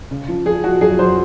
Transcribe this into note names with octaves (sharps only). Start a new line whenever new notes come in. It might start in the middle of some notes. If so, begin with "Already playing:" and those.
C#3
F3
F3 G#4
F3 F#4
F#2 G#4
F#2 C5